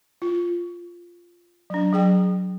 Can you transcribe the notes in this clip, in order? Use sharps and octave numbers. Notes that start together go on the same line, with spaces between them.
F4
F#3 D4
F#3 G#4 G5